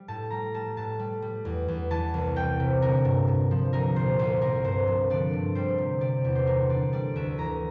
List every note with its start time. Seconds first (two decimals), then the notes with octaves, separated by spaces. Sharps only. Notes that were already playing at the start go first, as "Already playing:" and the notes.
Already playing: G3
0.08 A2 A5
0.30 G3 A#5
0.54 G3 A5
0.77 A2 A5
0.99 G3
1.22 G3
1.45 E2
1.68 E2
1.91 E3 A5
2.14 C2
2.36 G3 G5
2.60 C3
2.82 D3 A#4
3.05 G2
3.27 G2
3.51 F3
3.73 C2 A#4
3.96 A#2 C5
4.19 C2 C5
4.41 C2 A#4
4.64 G2 C5
4.87 F3
5.10 D3 D5
5.33 G2
5.55 G3 C5
5.78 C3
6.01 C3 D5
6.25 E2
6.35 C5
6.47 D3 A#4
6.69 D3 D5
6.93 G3 D5
7.16 D2 E5
7.38 E3 A#5